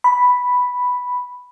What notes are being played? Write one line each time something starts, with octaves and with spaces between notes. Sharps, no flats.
B5